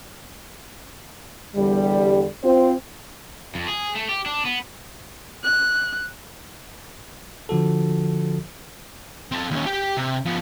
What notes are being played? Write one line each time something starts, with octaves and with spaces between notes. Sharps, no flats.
E2 D3 G3
C4 F4 C5
F2
G#4
A3
G4
D4
B3
F#6
D3 F3 F#4 A4
C4 A4
D#2 C#4
G4 G5
C3
F3 B3